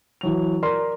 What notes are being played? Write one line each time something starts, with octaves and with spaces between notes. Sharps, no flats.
E3 F#3 F7
A#4 D5 C6